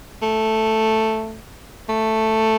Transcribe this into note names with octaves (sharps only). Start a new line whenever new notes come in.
A3
A3